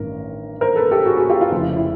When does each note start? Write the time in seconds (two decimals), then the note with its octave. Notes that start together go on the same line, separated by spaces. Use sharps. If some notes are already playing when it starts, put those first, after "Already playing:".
Already playing: A1 G2 D#3 A#4
0.61 A#4 C5
0.76 A4 B4
0.91 G4 A4
1.06 F#4 G#4
1.17 F#4 G#4
1.29 F4 G4
1.41 F4
1.52 F1 F2 C#3 F4
1.60 E4
1.76 E4